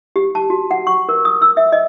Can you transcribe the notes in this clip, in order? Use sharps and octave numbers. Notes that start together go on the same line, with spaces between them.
G4
A5
F#4
F#5
C#6
A#4
D#6
E6
E5
D#5